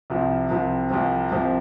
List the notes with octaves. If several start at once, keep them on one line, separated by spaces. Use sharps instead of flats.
C2 C3 F3 C4
C2 C3 F3 C4
C2 C3 F3 C4
C2 C3 F3 C4